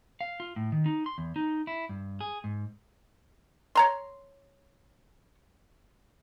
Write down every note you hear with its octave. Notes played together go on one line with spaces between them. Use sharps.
F5
F4
A2
D#3
D#4
C6
E2
D#4
E4
G2
G#4
G#2
C#5 A#5 C6